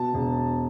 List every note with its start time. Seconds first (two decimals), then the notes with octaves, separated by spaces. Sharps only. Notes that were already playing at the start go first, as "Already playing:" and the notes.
Already playing: B2 A5
0.14 E1